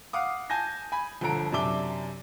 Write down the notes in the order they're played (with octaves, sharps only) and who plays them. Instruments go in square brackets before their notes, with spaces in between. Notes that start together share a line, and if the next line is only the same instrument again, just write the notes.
[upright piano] F5 F#5 D6 D#6
G#5 A5 G6 A#6
G#5 B5
G1 D3 F3 A4 A#5 D7
F#2 C3 D4 E5 D6 G7